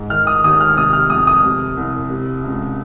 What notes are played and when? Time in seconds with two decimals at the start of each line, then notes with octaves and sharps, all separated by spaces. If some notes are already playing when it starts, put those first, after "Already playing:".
Already playing: G#2
0.10 D#3 F6
0.27 D#6
0.44 D#2 D#6
0.61 F6
0.76 C3 D#6
0.93 F6
1.10 F2 D#6
1.27 D#6
1.43 C3
1.77 C2
2.10 C3
2.44 C#2